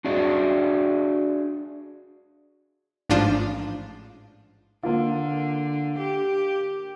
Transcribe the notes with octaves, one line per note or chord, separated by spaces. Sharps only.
D4 F#4 G#4 D5
A1 G#2 F3 D4 F4 D#7
D3 A#3 F4
G4